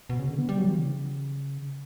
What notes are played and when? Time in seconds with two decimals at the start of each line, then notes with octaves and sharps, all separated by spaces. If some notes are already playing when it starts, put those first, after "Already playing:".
0.09 B2
0.19 C#3
0.29 D3
0.39 B3
0.49 G3
0.59 F#3
0.68 E3
0.79 C#3